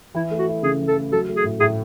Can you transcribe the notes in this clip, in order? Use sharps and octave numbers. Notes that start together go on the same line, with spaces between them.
E3 E4
A3
F#4
E4
C#3 G#4
E3
A4
A3
F#3 A4
A3
G#4
A2
A2 G#4